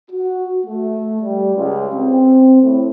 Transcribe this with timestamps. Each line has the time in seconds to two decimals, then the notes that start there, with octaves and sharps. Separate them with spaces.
0.11 F#4
0.65 A3
1.22 G3
1.56 C#2
1.94 C4
2.61 A2